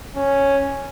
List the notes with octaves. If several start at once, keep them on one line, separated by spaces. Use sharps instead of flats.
C#4